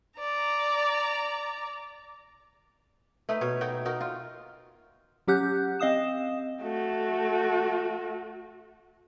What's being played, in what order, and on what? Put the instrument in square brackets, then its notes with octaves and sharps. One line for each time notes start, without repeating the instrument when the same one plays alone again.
[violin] D5 A#5
[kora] A3 D#4 B4
B2 C#5
D#4 F#4 G5
D#4 F#4 A#4
F4
[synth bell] F#3 C#4 G4 F#5 F#6 G6
C4 D#5 F5 D#6 E7
[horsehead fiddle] A3 F#4